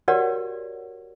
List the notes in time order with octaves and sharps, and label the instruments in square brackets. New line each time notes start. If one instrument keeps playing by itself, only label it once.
[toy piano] F#4 G4 A#4 C#5 D5 F#5